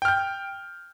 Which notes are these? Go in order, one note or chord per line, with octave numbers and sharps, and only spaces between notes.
G5 F6 G6